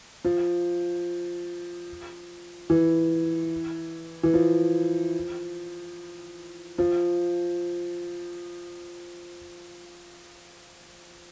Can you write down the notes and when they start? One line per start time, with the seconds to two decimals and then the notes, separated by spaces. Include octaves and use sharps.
0.24 F3
2.70 E3
4.23 E3
4.34 F3
6.78 F3